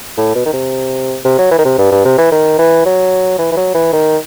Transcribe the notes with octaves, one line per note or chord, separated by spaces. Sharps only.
A2
B2
D#3
C3
C3
F#3
E3
D#3
C3
G2
G2
C3
E3
D#3
E3
F#3
E3
E3
F#3
E3
D#3